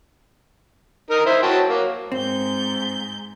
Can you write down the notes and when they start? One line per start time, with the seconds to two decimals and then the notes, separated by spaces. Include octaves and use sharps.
1.11 D#4 A#4 F6
1.26 E4 C5 C6
1.43 F#3 G5 A5
1.70 F#3 A#3
2.12 G#2 C4 G6